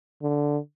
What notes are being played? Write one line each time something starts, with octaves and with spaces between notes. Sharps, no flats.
D3